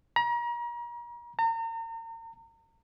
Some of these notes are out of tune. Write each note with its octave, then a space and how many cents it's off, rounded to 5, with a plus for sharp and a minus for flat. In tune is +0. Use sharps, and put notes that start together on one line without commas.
A#5 +35
A#5 -40